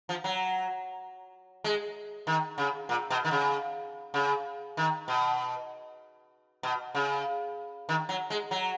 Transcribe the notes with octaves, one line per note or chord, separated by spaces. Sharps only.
F3
F#3
G#3
D#3
C#3
A#2
B2
D#3
C#3
C#3
D#3
B2
B2
C#3
D#3
F#3
G#3
F#3